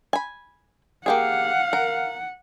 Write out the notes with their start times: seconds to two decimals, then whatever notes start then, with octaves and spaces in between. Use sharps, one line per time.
0.13 G#5 B5
1.06 A#3 G4 G#4 F5 F#5
1.73 A#4